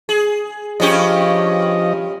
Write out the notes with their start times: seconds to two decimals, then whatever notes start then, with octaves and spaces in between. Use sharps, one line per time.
0.09 G#4
0.80 G2 F3 C#4 G4 D#5